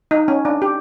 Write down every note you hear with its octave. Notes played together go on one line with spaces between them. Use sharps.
D#4
C#4
D4
G4